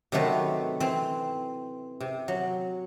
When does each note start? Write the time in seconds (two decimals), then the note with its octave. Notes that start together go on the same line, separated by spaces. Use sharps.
0.12 C3 D#3 F#3 A3 B4
0.80 E3 C4
2.00 C3
2.28 F#3